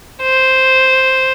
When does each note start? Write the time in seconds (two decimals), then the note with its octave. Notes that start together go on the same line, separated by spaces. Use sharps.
0.21 C5